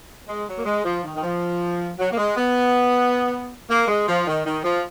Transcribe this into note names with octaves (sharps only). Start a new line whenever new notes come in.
G#3
F#3
A#3
G#3
F3
D#3
D#3
F3
F#3
A#3
G#3
B3
A#3
G#3
F3
D#3
D#3
F3